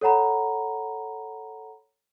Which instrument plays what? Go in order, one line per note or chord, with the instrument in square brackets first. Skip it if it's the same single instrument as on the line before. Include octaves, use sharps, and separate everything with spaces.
[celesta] A4 C#5 F#5 A#5 B5